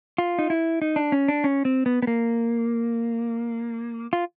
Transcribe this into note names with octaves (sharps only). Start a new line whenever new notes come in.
F4
D#4
E4
D#4
D4
C#4
D4
C#4
C4
B3
B3
A#3
F4